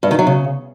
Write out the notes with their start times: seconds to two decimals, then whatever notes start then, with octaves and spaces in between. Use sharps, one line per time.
0.03 G2
0.11 D#3
0.19 F#3
0.27 C#3